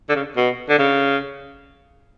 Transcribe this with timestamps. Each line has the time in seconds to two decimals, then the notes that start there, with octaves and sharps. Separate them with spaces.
0.09 D3
0.16 C#3
0.37 B2
0.69 D3
0.79 C#3